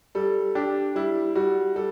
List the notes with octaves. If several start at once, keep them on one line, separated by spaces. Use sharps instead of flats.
G3 A4
D4 G4
G3 E4
G3 F#4
G3 A4